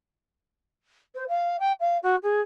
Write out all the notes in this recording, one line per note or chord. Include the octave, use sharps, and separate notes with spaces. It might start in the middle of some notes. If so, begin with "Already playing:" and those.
C5
F5
G5
F5
F#4
G#4